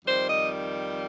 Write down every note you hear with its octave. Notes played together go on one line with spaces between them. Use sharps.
F2 D#3 G3 C5
D#5